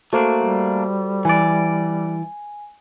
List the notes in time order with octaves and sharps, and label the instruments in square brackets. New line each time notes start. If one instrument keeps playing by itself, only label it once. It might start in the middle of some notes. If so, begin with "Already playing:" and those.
[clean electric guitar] A3 A#3 D4 [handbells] F#4 A4 C5
[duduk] G3
[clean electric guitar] E3 D5 [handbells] G#5